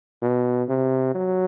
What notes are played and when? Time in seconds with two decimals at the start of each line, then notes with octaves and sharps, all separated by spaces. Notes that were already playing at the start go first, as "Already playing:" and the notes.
0.22 B2
0.69 C3
1.15 F#3